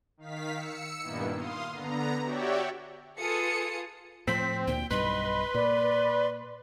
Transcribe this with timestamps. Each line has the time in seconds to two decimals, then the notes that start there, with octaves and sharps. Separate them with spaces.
0.17 D#3 F5 B6
0.55 E6 C#7
1.03 G2 A#2 D#3 A#3 B3 E4
1.35 F5 C6 D#6
1.70 D3 B3 A#5
2.22 F#4 G4 C#5 D5 E5 G5
3.19 F4 G#4 A4 B4 D#6 C#7
4.27 A2 F3 C4 B6
4.67 D2 A#2 G5
4.91 B1 G2 G3 B4 D#5 C6
5.55 A#2 D5